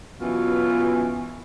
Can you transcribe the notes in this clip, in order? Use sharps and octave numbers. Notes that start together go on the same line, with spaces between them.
F#2 B2 E3 F4